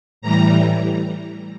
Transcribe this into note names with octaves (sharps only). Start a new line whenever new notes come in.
A2 E3 G3 A#5